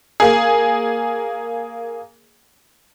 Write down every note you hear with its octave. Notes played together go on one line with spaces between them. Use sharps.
A#3 G#4